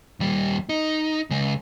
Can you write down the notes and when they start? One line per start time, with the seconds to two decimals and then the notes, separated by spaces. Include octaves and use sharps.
0.20 D#2 G3
0.69 D#4
1.31 C#3 G#3